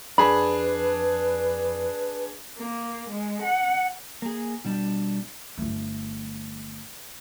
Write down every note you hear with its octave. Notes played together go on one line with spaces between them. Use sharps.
F2 D4 G#4 B4 B5
A#3
G#3
F#5
A#3 G#4
B2 G3 D4
G1 A3